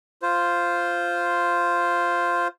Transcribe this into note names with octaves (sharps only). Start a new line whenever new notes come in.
F4 C5